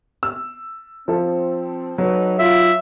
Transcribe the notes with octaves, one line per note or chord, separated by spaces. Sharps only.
E6
F3 C4 A4
F#3 D#4 A4 B4
F4 E5